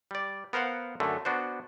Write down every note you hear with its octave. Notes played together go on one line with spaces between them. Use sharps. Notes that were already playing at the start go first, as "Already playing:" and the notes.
G3 D5
B3 A#4 C5 F5 F#5
F#2 D3 A3
B3 D4 F#4 C5